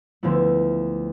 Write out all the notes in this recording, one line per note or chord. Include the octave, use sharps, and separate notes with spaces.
D2 D3 F3 B3 E4